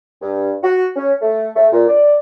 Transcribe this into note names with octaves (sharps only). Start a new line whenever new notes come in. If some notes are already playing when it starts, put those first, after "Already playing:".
G2
F#4
C#4
A3
A3
A#2
D5